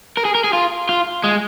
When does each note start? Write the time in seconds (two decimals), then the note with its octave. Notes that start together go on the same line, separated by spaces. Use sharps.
0.17 A#4
0.25 G#4
0.35 A#4
0.44 G#4
0.53 F4
0.89 F4
1.24 G#3